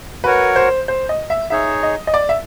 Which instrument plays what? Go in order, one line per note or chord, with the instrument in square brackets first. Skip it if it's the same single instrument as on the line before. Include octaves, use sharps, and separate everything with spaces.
[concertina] F#4 A#4 C#5 F#5 [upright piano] B4
[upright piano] C5
C5
D#5
E5
[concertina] D#4 G#4 C#5 [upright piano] E5
[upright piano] D#5
D#5
D5
E5